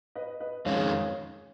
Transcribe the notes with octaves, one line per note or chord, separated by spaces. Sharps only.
B4 D#5
B4 D#5
F2 D#3 G#3 C#4 C#5 F5